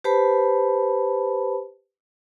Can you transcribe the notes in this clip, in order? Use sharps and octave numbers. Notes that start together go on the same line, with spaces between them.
G4 B4 C5 A5 B5